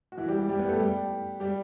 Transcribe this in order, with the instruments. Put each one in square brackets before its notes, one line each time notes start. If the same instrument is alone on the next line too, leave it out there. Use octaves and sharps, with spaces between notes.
[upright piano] F#4
E3 E4
G3 G4
G3 G4
G3 G4
B3 B4
G4
A3 A4
G3 G4
G3 G4